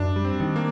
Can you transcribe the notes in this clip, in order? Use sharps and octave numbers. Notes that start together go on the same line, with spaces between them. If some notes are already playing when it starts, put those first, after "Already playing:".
Already playing: F#2 D4
G3
C4
D#3
A#3